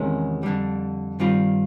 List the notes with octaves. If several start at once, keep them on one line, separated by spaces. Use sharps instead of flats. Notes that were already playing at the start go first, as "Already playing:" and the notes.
Already playing: E2 C3 D#3 G#3 C#4
F2 D3 G3
G2 D#3 G3 C4 F4